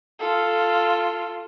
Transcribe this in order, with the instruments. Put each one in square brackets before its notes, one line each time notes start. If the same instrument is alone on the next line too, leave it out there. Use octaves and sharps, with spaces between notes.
[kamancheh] F4 A4